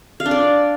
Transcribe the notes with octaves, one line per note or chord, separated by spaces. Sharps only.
F5
D4
D5